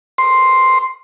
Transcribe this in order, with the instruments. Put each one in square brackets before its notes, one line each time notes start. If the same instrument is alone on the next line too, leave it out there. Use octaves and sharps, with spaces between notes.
[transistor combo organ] C6